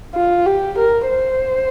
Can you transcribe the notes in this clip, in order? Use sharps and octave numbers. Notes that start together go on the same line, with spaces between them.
F4
G4
A#4
C5